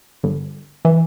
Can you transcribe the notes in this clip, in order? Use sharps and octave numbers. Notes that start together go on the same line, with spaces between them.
G1
E3